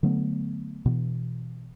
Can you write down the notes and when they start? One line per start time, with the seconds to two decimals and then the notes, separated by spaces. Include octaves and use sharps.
0.03 D3 F#3 A3 B3
0.86 B2 E3